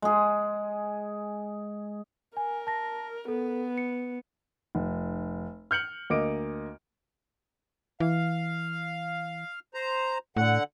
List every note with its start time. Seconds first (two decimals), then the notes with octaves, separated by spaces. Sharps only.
0.02 G#3 G#4
2.37 A#4 G#5
2.67 A5 A#6
3.28 B3 A4
3.78 C#7
4.75 F1
5.71 F6 G6 C#7 F#7
6.10 D2 A#3 D#5 D6 D7
8.00 E3 F5
9.74 C5 A#5
10.37 A2 D3 F#5